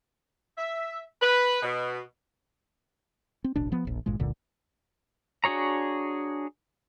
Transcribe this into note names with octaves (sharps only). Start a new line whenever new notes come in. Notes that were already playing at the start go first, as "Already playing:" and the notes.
E5
B4
B2
C4
D1 A1 B2 D4
F3 B3
E1 A#1
G#1 G2 A#2 G#3
E1 C#2 A#2 D3
D4 F#4 G#4 C#5 A#5